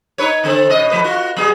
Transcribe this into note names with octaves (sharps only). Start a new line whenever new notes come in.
D#4 B4 C#5
D3 C4 A4
B2 C#4 D#5
F3 A3 B4
F4 F#4
F#3 B3 G#4